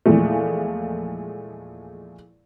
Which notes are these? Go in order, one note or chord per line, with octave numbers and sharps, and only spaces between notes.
E2 A#2 E3 F3 G#3 A3